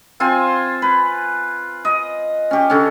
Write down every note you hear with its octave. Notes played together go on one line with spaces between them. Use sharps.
C4 F4 C5 G#5
B4
D#5
C#4 G4
D3 C#4